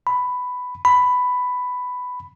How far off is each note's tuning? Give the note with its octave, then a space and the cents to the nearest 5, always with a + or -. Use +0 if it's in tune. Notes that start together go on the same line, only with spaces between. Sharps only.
B5 +10
B5 +10